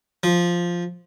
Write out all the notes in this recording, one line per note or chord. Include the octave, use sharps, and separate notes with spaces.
F3